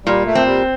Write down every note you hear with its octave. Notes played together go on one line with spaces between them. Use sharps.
A#2 G3
A3
C4
G3